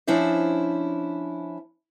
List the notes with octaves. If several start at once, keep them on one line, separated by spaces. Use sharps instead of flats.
F3 C#4 D4 E4 C5